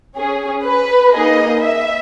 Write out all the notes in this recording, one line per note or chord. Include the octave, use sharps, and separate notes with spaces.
C#4 G#4
B4
A#3 D#4 G#4 D#5
E5